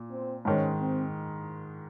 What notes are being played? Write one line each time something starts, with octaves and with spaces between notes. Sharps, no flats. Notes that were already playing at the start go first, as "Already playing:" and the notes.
Already playing: A#2
C4
G#2 D#3 G#3 C#4
C4